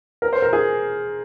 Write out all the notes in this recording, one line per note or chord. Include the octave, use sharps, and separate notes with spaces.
A#4
C5
A#4
G#4